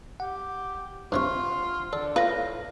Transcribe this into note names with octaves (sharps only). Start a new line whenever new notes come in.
G4 F#5
G2 C3 F4 C#6
D3 A4 D5
A2 F4 B4 F5 A#6